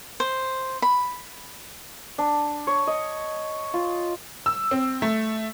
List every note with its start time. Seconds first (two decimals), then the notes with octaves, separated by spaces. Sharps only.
0.20 C5
0.82 B5
2.18 D4
2.67 C#5
2.87 D#5
3.74 F4
4.46 E6
4.71 C4
5.02 A3